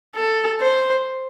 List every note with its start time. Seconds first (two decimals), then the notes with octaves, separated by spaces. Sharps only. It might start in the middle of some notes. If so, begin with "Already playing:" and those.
0.15 A4
0.61 C5